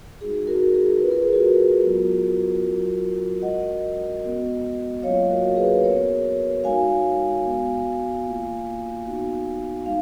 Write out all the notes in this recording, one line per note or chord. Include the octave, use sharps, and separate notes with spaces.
G#3 D#4 F#4 G#4
F#4 A#4
G#4
G#3 C#4 F4 B4
A#4
G#4
F#4 A#4
F#3 B3 F4
F#3 C#4 F4
G#3 C#4 F#4 D#5 F#5
G#3 B3 F#4
F#3 A#3 C#4 F4 C#5 F5
F#4 A#4
G#4 B4
B3 F#4 A#4 C#5
G#3 D#4 F#4 F5 G#5
B3 F#4
A#3 F4
B3 D#4 F#4
G#3 D#4 F5